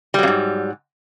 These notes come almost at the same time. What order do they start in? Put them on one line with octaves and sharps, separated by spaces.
G3 F#3 F2 G#2